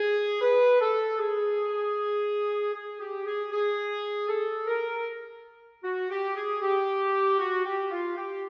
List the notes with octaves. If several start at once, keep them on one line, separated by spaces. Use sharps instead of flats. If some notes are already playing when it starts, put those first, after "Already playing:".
Already playing: G#4
B4
A4
G#4
G#4
G4
G#4
G#4
A4
A#4
F#4
G4
G#4
G4
F#4
G4
F4
G4